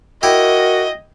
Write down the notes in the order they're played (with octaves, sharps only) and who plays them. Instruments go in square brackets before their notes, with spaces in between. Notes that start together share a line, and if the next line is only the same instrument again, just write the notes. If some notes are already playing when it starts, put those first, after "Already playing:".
[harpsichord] E4 G4 [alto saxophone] F#4 [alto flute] A#4 [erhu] D#5